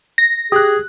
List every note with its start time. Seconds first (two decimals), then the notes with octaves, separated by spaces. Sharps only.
0.18 A#6
0.52 G4 G#4 D#6 F#6